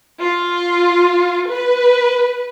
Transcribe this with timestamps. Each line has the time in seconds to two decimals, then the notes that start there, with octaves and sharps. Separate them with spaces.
0.20 F4
1.49 B4